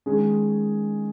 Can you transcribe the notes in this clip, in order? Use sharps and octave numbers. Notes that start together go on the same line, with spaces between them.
D#3 G#3 C#4 G#4